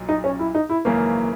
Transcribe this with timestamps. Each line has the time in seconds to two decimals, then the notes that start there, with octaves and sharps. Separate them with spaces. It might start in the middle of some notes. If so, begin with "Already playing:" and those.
Already playing: B1 A#2 F#3
0.09 D#4
0.24 C#4
0.39 E4
0.55 D#4
0.70 E4
0.85 G#1 F#2 C#3 E3 A#3